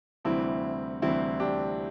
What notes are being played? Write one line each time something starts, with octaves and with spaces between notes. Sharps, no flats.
D2 C3 E3 G3 C4 E4
D2 C3 E3 G3 C4 E4
D4 G4